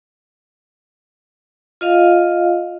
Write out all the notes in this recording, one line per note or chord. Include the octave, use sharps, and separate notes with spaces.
F4 D#5 F5